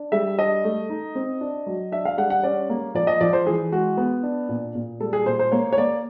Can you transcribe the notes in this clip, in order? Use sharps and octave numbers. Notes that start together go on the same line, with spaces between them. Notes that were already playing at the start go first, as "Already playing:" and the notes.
Already playing: D4
G3 E5
D4 D#5
A3
D#4
C4
D4
F#3
D4 E5
F5
G3 F#5
F#5
C#4 D5
A#3
F3 D5
D#5
F3 D5
C5
E3 G#4
G#3 F#4
B3
D4
A#2
A#2
G3 A4
G#4
A#2 C5
C5
A#3 C#5
C#5
A#3 D5